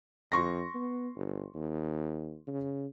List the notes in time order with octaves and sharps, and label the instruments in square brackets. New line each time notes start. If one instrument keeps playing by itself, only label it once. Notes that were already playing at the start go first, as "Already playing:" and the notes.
[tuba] F2 [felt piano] C6 C#6 A#6
[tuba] B3
G1
D#2
C#3